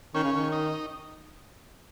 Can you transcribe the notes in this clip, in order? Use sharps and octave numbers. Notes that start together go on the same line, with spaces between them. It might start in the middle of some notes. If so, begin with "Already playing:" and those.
D#3 C#4
C#3
D#3
D#4